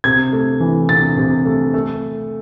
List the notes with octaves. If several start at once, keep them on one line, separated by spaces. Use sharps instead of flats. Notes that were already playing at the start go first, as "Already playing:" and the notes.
C3 G#6
A3
E3
C3 A6
C3
A3
A3